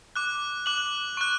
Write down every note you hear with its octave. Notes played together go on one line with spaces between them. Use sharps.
D6 F#6
D6 F#6 F#7
C#6 F#6